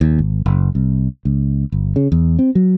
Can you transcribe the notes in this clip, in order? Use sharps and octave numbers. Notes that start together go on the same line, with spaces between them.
D#2
G#1
F#1
C2
C#2
G1
C#3
E2
C4
F#3